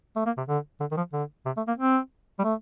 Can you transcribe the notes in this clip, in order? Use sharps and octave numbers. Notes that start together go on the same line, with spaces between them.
A3
A#3
C3
D3
D3
D#3
F3
D3
C3
A3
A#3
C4
G3
A3